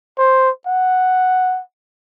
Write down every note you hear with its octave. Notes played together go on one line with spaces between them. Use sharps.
C5
F#5